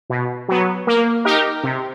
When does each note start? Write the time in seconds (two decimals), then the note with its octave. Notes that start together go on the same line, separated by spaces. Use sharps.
0.10 B2
0.48 F#3 B3
0.87 A#3
1.25 D#4 G4 A#4
1.64 C3